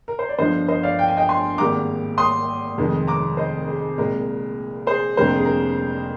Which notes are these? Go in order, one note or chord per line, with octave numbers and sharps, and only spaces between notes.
A#4
C5
D5
G1 G2 D3 F3 C5 D#5
C5 D#5
D5 F5
G5
G#5
D#5 G5
G#5 C6
G#1 G#2 G3 A#3 A#5 D6
C6 D#6
F1 F2 D#3 G#3
A#5 D6
C5 D#5
G#4
C2 A#2 G#3 A#4
G#4 C5
F1 F2 D3 G3 A#3 C5
A#4
G#4
A#4